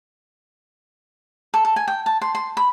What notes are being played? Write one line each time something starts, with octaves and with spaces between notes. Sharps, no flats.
A4
A4
G#5
G5
A5
C6
C6
B5